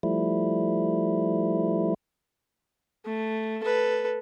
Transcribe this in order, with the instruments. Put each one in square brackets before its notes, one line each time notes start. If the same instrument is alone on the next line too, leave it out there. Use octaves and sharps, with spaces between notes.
[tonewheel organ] F3 G3 A3 E4
[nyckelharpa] A3
A4 B4